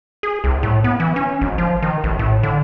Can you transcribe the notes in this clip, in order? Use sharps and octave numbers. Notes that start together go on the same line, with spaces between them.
G#4
C2
A2
B3
E3
C#4
G#1
F3
D#3
A1
A2
D3